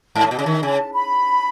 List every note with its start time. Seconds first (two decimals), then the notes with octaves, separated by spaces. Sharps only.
0.15 G#2
0.23 A2
0.30 B2 D#5
0.39 C#3
0.46 D#3 E5
0.62 C#3 G#5
0.78 A5
0.94 B5